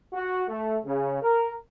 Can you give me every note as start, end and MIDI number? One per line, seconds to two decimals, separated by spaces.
0.13 0.43 66
0.48 0.78 57
0.85 1.20 49
1.22 1.52 70